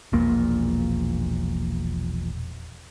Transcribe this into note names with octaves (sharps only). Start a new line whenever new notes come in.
E1 A#1 A#2 A#3